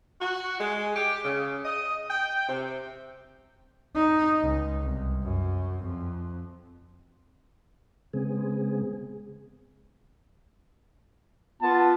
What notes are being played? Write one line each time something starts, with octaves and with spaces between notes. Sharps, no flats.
F#4
G#3
G4
C#3
D#5
G5
C3
D#4
C#2
C2
F#2
F2
C#3 G#3 B3 C4 G#4
B3 F4 A5